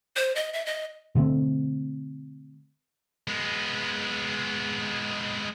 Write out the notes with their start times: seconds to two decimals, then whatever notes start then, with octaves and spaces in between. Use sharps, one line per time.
0.16 C5
0.36 D#5
0.53 E5
0.66 D#5
1.15 B2 D3 A3 C4
3.28 G#3 B3